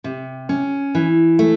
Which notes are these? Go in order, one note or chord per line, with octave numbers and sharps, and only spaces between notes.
C3
C#4
E3
A3